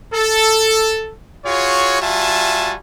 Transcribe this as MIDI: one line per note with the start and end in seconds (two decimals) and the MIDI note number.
0.14 1.12 69
1.46 1.99 65
1.46 1.99 66
1.46 1.99 68
1.46 1.99 73
2.01 2.75 55
2.01 2.75 65
2.01 2.75 66
2.01 2.75 76
2.01 2.75 80
2.01 2.75 81